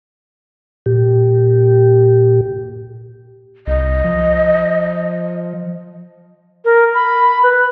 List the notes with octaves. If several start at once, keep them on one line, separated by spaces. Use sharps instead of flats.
A#2 G4
C2 D#5
F3
A#4
B5
B4